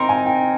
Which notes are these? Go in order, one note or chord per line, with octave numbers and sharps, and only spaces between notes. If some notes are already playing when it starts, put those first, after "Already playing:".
Already playing: C4 D#4 A#4 C6
G#5
G5